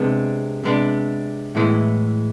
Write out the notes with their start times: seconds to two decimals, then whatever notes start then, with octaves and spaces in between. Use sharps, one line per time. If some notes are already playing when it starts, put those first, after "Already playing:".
Already playing: C3 G#3 B3 D4
0.64 C3 G#3 B3 D4
1.55 A2 E3 G#3 B3 E4